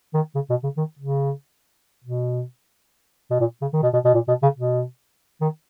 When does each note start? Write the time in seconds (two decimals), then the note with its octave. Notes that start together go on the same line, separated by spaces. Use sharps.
0.14 D#3
0.35 C#3
0.50 B2
0.63 C#3
0.77 D#3
0.99 C#3
2.04 B2
3.30 B2
3.40 A#2
3.61 C#3
3.73 D#3
3.83 B2
3.93 B2
4.05 B2
4.14 A#2
4.28 B2
4.42 C#3
4.57 B2
5.41 D#3